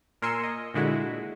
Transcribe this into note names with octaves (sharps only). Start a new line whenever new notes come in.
A#2 A#4 G#5 C6 E6 C#7
D#5
A#2 D3 G#3 E4 F#4